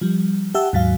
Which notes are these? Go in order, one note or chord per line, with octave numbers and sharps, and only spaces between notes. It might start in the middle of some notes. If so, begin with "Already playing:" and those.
F3 G3
G4 E5 F#5 A5 E6
D#2 G#2 F#3 F5